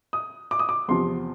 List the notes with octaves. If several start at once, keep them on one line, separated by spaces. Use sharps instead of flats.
D#6
D6
D#6
D6
E2 C3 F3 C6